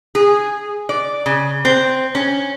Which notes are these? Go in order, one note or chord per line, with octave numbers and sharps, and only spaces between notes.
G#4
D5
C#3
C4
C#4